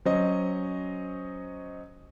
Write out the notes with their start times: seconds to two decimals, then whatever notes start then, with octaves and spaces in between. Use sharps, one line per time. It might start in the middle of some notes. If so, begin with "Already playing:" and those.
0.05 F#3 C#4 C5 D#5